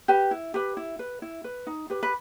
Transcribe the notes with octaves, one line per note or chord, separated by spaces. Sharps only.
G4 B4
E4
G4 B4
E4
B4
E4
B4
D#4
G4 B4
B4